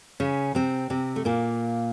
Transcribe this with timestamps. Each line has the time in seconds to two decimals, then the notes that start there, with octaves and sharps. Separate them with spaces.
0.20 C#3 C#4
0.55 C3 C4
0.90 C3 C4
1.16 A3
1.25 A#2 A#3